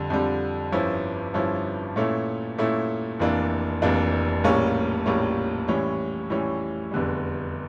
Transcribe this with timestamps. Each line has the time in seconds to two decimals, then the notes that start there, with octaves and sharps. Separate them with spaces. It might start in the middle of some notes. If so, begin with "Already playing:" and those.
Already playing: F2 D3 G3
0.10 F2 D3 G3
0.72 G1 G2 F3 C#4 E4
1.34 G1 G2 F3 C#4 E4
1.96 A#2 A3 C#4 E4
2.58 A#2 A3 C#4 E4
3.20 F1 F2 E3 A#3 D4
3.82 F1 F2 E3 A#3 D4
4.44 A#1 A2 G3 A#3 C#4
5.06 A#1 A2 G3 A#3 C#4
5.68 A2 E3 G3 C#4
6.30 A2 E3 G3 C#4
6.92 F1 E2 D3 G3